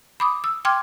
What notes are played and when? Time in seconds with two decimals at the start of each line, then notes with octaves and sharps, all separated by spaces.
0.20 B5 D6 D#6
0.44 E6
0.65 G5 C6 D6 F6 G#6